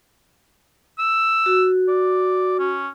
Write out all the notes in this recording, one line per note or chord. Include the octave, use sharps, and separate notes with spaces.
E6
F#4
D5
C#4